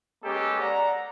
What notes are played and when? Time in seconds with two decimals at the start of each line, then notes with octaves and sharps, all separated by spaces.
0.24 G#3 A#3 B3 C#4 G4 A4
0.60 D5 F#5 A#5